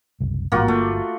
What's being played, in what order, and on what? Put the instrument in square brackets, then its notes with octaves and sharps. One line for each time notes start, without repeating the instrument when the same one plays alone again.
[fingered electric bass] F#1 C2
[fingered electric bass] A1 G#2 [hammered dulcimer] A#3 F4 F#4
[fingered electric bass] G1 A#3 [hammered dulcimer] A3